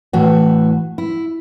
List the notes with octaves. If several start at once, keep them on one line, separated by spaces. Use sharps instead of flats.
A2 E3 F#4
E4